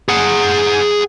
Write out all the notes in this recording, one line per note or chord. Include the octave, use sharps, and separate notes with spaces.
G#4 F#5